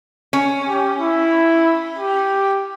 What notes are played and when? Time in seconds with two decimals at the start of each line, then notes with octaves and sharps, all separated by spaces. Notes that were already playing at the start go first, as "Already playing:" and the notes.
0.33 C#4
0.68 G4
0.99 E4
1.99 G4